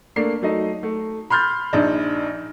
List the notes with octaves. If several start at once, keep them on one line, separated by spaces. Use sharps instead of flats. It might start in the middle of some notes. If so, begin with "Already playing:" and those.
A3 A#3 D4 C7
F#3 A3 D#4 D#5
A3
B5 C6 F6 G6 A6
A#1 D4 D#4 D#5